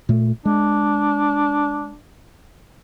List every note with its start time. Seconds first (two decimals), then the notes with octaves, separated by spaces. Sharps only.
0.09 A#2 A3
0.45 G#3 D4